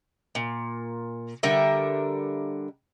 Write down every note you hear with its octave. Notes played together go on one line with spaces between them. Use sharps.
A#2
D3 G3 A#4 E5